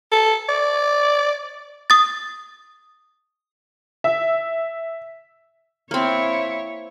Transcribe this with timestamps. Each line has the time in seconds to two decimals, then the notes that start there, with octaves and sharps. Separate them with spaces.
0.12 A4
0.49 D5
1.90 D#6 A6
4.04 E5
5.91 A#3 C4 E4 C#5